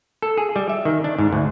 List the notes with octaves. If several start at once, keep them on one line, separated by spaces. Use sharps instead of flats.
A4
G#4
G3
E5
D#3
D4
G#2
D2